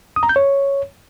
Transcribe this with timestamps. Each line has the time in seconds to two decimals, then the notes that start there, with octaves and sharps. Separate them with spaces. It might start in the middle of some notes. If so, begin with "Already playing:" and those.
0.16 D#6
0.23 A#5
0.29 G6
0.36 C#5